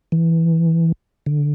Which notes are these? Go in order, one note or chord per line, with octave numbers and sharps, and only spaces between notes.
E3
D3